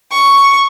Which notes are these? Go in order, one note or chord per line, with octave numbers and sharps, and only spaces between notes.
C#6